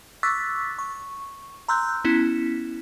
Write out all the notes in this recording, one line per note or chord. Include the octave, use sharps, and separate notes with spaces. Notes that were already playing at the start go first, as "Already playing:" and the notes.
C#6 D6 E6 F#6 A6 B6
C#6
A#5 C6 E6 F#6 G6
B3 C#4 E4